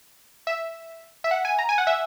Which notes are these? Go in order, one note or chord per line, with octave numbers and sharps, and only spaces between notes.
E5
E5
F#5
G#5
A#5
G#5
F#5
E5